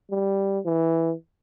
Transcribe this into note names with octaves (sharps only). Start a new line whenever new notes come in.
G3
E3